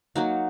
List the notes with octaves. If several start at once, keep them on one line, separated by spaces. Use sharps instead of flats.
F#3 A#3 D#4 F#4